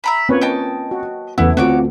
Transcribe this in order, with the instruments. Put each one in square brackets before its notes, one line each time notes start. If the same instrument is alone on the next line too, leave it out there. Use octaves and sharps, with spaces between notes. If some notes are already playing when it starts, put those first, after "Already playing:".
[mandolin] E5 A#5 B5
[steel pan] A#3 B4 C#5 [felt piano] C4 C#4 F4
[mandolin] D#5 G5 A5
[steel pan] F#4
[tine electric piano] E2 F#5 [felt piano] C#3 E3 [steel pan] A3 B3 [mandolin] E4
[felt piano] D2 [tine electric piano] C4 F4 [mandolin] F#4 C#5 D6